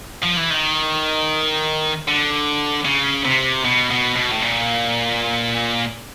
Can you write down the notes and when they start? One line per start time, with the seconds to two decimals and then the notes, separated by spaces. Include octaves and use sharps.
0.23 F3
0.37 E3
0.50 D#3
2.08 D3
2.85 C#3
3.25 C3
3.65 B2
3.90 B2
4.16 B2
4.31 A2
4.42 A#2